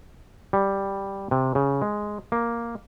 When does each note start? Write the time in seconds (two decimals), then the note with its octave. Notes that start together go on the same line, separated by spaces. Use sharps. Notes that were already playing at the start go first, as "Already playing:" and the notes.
0.53 G3
1.31 C3
1.55 C#3
1.82 G#3
2.32 A#3